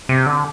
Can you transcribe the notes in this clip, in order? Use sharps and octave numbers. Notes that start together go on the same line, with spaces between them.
C3
D3